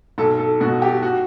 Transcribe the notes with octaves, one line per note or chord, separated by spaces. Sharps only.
B1 A4
A4
B2 F#4
G4
F#4